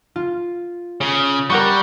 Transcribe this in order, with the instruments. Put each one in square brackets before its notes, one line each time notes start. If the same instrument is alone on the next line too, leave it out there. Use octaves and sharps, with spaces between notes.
[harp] F4
[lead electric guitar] C#3
[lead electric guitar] G3 [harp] A#4 F#5 C#6